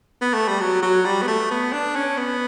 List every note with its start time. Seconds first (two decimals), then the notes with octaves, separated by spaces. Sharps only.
0.22 B3
0.34 A3
0.48 G3
0.60 F#3
0.83 F#3
1.05 G3
1.22 B3
1.28 A3
1.51 B3
1.73 D4
1.96 C#4
2.17 B3